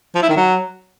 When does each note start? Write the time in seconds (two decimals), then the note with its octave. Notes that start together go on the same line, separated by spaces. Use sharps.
0.15 F3
0.22 E4
0.29 D#3
0.37 F#3